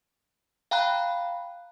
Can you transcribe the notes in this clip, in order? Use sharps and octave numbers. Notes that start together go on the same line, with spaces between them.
F5 G5 A#5 B5 F#6